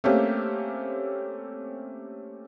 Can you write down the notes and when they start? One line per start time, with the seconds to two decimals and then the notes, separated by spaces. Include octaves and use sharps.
0.04 A3 A#3 C4 C#4 G4